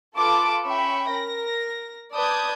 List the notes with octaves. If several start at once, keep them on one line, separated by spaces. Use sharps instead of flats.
F4 A4 B4 A5 D6
C#4 E5 G5 B5 C#6
A#4 A#6
B4 D5 A5 D#6 G6 G#6